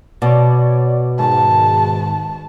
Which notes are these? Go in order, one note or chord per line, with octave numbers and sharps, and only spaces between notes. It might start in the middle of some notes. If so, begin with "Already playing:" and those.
B2 C#5 D5
G#2 D#3 A5